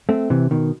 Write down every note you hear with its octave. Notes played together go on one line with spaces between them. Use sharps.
A3 C4
C3 E3
B2 D#3